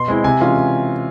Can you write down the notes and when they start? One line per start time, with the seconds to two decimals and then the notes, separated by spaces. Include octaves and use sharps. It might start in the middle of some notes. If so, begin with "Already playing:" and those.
Already playing: B2 C6
0.08 G#3 C4 E4
0.24 C3 G#5
0.40 E3 G#3 C#4 F4